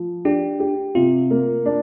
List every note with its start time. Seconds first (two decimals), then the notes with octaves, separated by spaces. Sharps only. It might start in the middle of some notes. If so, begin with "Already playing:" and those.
Already playing: F3
0.25 D4 G4
0.60 G4
0.95 C3 F4
1.31 A#3
1.65 D4